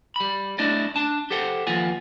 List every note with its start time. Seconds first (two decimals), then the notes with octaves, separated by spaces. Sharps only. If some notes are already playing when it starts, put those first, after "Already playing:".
0.16 G3 B5
0.59 A3 D4 E4 D5 D#5
0.96 D4 A5
1.31 G4 A4 C5 F#5 G5
1.67 D#2 F3 F4 B4 F#5 G#5